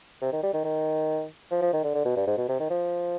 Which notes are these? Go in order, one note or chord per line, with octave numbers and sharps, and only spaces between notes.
C3
D#3
G3
D#3
D#3
F3
F3
D#3
D3
D3
B2
G2
G#2
B2
C3
D#3
F3